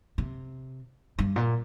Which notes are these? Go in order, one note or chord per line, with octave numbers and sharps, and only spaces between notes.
C3
G2
A#2